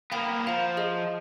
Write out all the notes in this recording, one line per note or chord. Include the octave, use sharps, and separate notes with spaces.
A#3 B3 F5 G5 B5
F3 F5 F#5 A#5
G#4 D#5